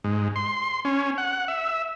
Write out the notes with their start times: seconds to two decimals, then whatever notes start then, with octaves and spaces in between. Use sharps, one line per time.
0.04 G#2
0.36 C6
0.85 C#4
1.18 F#5
1.48 E5